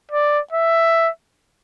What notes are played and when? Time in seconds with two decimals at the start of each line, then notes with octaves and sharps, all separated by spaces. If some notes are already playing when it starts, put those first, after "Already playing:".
0.11 D5
0.52 E5